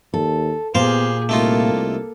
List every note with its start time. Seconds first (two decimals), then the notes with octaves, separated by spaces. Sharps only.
0.14 D#2 A4
0.75 A#2 B3 G4 G#4 C5 F5
1.29 C2 A3 A#3 D#4 F4 A4